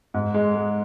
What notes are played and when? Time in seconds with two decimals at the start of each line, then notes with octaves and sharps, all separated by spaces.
0.14 G#2
0.34 G#3
0.55 G#3